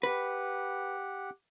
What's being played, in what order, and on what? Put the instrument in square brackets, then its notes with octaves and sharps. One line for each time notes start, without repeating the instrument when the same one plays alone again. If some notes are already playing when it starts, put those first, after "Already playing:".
[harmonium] G4 F#5 [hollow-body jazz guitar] B4